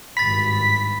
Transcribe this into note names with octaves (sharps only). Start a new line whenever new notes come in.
G#1 G2 B5 A6 B6